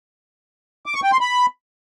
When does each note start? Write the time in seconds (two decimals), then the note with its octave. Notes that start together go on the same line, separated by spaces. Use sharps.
0.86 D6
0.95 C#6
1.03 G5
1.12 C6
1.21 B5